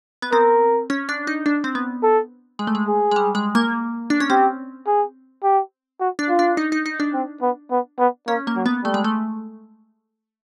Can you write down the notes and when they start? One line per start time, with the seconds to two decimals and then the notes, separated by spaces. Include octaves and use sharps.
0.22 B3
0.32 C4 A#4
0.90 C#4
1.09 D4
1.27 D#4
1.46 D4
1.64 C4
1.75 B3
2.03 A4
2.59 G#3
2.67 A3
2.75 G#3
2.88 G#4
3.11 G#3
3.16 G3
3.35 G#3
3.55 A#3
4.10 D4
4.20 C#4
4.30 C4 G4
4.87 G#4
5.44 G4
6.00 F#4
6.19 D4
6.29 F4
6.39 D4
6.57 D#4
6.72 D#4
6.86 D#4
7.00 D4
7.14 C4
7.42 B3
7.71 B3
7.99 B3
8.28 A#3 C#4
8.47 A#3
8.56 F#3
8.66 B3
8.84 G3 A3
8.94 G#3
9.04 A3